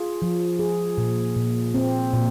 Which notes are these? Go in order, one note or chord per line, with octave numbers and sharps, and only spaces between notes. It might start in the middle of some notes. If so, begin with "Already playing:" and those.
Already playing: F4 G#4
F3
G#4
A#2
A#2
C4
A#2